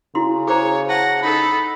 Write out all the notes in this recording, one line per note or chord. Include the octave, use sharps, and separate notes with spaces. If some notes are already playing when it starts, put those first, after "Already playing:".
C#3 E4 F#4 C6
G#4 C5 C#5 A#5
F#5 A5 A#6
D#4 A4 B5